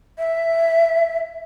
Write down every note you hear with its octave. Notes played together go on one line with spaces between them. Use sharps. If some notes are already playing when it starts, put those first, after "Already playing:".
E5